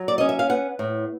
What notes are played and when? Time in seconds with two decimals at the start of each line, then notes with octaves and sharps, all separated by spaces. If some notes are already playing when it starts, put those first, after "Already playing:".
Already playing: F#3
0.08 D5
0.18 C#4 D#5
0.29 E5
0.39 F5
0.49 B3 F#5
0.79 A2